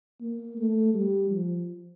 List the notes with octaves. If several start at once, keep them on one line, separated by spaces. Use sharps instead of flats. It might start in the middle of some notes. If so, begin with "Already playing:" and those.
A#3
A3
G3
F3